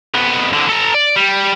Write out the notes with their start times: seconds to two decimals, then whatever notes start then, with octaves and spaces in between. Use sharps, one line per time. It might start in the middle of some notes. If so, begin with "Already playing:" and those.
0.15 F2 B3
0.53 C2 D3
0.69 A4 A#5
0.94 D5
1.16 G3